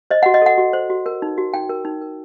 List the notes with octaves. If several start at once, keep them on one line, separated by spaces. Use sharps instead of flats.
C5 D#5
F#4 F#5
D#5
A4 F#5
F#4
C5
F#4
A#4
D#4
F#4
D#4 G5
A#4
D#4
A#4